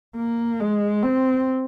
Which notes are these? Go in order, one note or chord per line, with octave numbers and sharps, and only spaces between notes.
A#3
G#3
C4